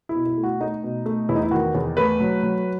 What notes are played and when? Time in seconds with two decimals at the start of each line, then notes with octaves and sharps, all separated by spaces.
0.09 E4
0.15 B2
0.26 E4
0.37 A3
0.43 F#4
0.60 A3 D#4
0.83 B2
1.06 A3
1.29 E2 E4
1.35 D#4
1.43 E4
1.51 D#3 F#4
1.75 E2
1.97 A3 B4
2.20 F#3
2.43 F#3